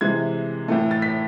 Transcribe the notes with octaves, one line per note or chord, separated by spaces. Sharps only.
C3 E3 G#3 G#6
A2 E3 A3
A6
B6